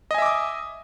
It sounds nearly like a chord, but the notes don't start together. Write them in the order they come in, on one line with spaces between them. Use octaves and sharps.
D#5 G#5 E5 D6 D#6